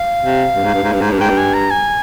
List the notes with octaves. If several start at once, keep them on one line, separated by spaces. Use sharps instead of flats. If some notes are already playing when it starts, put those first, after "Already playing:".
Already playing: F5
C3
G2
G#2
G2
G#2
G2
G#2
G2
G#2 G5
G2
G#5
A#5
G#5